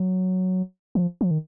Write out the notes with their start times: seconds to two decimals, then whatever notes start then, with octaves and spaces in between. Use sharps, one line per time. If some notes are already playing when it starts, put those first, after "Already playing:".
Already playing: F#3
0.95 D#3
0.99 F3
1.21 F3
1.31 D#3